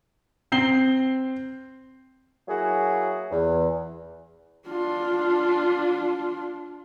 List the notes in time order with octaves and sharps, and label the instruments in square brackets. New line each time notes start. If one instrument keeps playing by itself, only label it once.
[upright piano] C4 C7 G7
[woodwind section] F#3 A#3 E4 F#4 G#4
E2
[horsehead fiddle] D4 F4